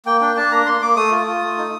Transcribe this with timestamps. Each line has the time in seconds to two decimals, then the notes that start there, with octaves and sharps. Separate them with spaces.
0.06 A#3 G5
0.21 D4 G5
0.37 D4 A5
0.52 A#3 A#5
0.66 A#3 C6
0.81 A#3 D6
0.96 A3 D#6
1.11 F4
1.27 F4
1.42 A3
1.58 D#4